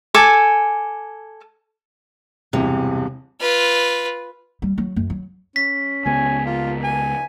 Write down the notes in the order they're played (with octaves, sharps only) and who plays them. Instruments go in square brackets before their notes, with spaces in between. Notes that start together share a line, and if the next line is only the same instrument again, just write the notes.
[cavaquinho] A4 G#5 D6
[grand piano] E1 G2 E3 [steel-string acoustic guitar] C3
[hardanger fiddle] F4 B4
[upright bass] G3
F#3
F#2
F#3
[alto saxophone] C#4 [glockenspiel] B6
[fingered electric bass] C#2 C#3 B3 [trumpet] G#5
[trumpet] A#3 [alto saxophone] F4
[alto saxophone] G#5